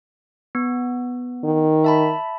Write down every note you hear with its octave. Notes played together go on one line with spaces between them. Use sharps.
B3
D#3
E5 A5 B5